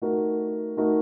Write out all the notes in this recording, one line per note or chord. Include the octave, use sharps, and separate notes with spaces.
A3 D#4 F#4 A#4
A3 D#4 F#4 A#4